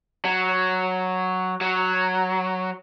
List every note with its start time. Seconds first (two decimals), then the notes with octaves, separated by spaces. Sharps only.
0.25 F#3
1.61 F#3